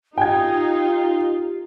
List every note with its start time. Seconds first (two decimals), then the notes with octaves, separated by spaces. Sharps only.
0.18 D#4 F4 G4 G5 G#6